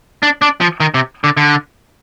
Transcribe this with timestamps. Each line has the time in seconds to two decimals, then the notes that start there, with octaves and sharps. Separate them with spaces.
0.23 D4
0.42 D4
0.61 F3
0.80 D#3
0.94 C3
1.24 D3
1.37 D3